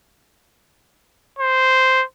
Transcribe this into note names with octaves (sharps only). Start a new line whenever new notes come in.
C5